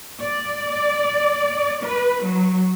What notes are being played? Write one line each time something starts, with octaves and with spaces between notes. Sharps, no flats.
D5
B4
F#3